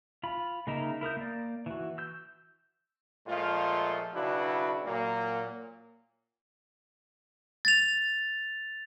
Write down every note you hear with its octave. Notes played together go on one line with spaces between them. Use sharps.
F4 B5
C#3 A#3 D#4 A#4 E5
E4 A#4 D#6 G6
A#3 D5
E3 F#4
E6 G6
A#2 F3 G#3 A3 F4
B1 C#3 D4 E4 F#4 B4
A#2 F#3 A#3
A6 F7